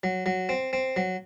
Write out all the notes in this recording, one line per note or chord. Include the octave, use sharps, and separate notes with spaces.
F#3
F#3
C4
C4
F#3